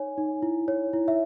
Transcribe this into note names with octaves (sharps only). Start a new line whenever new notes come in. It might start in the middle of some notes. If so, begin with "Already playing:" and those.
Already playing: D#4 C#5 G#5
D#4
E4
C#5
E4
E5